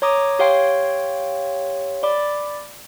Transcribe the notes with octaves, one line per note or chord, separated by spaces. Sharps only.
C#5 A#5 D6 D#6
G4 C#5 F5 G5 C6
D5 B5 D6